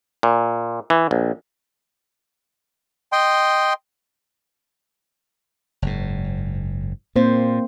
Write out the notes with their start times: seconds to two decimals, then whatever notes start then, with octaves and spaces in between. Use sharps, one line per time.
0.23 A#2
0.90 E3
1.11 A#1
3.12 D#5 G5 C6
5.82 F#1 G#2
7.16 A#2 A#3 C4 C5